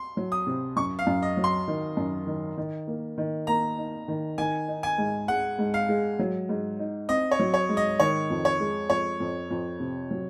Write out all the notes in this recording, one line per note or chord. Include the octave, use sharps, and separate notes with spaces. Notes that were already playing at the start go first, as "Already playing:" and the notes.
Already playing: C6
F#3
D#6
C3
F#2 C#6
F5
F#2
D#5
F#3
C6
D#3
F#2
D#3
D#3
A#3
D#3
A#3 A#5
D#4
D#3
D#3 G#5
D#4
G#5
G#2
G#3 F#5
G#2
F5
G#3
F#3
G#2
D#4
C4 D#5
C#5
F#3
C#5
G#2
D#5
D#3 C#5
F2
C#5
G#3
F2 C#5
F2
F2
C3
F#3